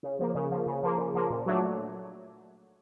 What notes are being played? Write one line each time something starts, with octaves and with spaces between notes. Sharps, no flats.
C#3
F3 A#3
C#3
F3 A#3
C#3
F3 A#3
C#3
F3 A#3
A#2
F#3 A3 D4